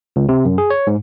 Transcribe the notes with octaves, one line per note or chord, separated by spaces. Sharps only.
C#2
C3
F#2
G#4
C#5
G#2